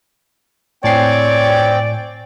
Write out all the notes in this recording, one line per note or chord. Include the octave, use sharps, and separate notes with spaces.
A2 C4 C#5 D5 G5 G#5 C7